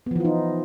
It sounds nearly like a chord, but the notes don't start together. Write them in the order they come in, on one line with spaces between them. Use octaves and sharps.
B3 F3 E3 F4 D#4